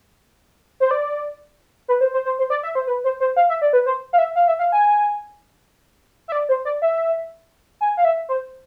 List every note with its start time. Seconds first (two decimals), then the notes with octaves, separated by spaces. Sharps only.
0.80 C5
0.91 D5
1.88 B4
2.01 C5
2.14 C5
2.25 C5
2.39 C5
2.50 D5
2.63 E5
2.75 C5
2.87 B4
3.04 C5
3.20 C5
3.36 F5
3.49 E5
3.62 D5
3.73 B4
3.86 C5
4.13 F5
4.18 E5
4.36 F5
4.48 E5
4.59 F5
4.72 G#5
6.28 E5
6.32 D5
6.49 C5
6.65 D5
6.82 E5
7.81 G#5
7.97 F5
8.05 E5
8.29 C5